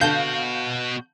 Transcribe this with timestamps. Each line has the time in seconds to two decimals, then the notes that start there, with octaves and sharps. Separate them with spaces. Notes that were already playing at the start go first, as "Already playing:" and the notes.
0.01 B2 D3 F#4 F5 A5 G6